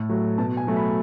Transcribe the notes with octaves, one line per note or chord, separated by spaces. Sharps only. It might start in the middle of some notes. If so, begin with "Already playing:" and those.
Already playing: A2
F#3 A3
B2 A5
G#5
F#3 A3
B5